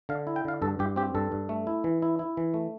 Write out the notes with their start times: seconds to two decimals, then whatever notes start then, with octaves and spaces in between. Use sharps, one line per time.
0.09 D3 F5
0.27 E4
0.36 G5
0.45 D3 F5
0.62 G2 A4
0.79 G2 G4
0.96 C4 G4
1.15 G2 A4
1.32 G2
1.49 A3
1.67 E4
1.84 E3
2.02 E4
2.19 E4
2.37 E3
2.54 A3